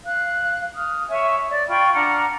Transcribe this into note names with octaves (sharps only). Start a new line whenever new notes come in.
F5 F#6
D#6 F6
C#5 E5 G#5 C#6
D5
F4 G5 B5 C#6
D4 F#5 A#5 F6